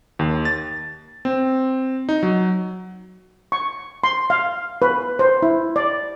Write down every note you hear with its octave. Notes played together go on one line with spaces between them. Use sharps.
D#2
A6
C4
D#4
F#3
C#6
C6
F5
B4
C5
E4
D5